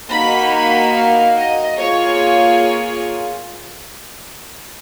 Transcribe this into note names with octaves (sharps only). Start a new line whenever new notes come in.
A#3 D#4 F#4 B5
B5
F5
D#5
A#3 F4 G#4 C#5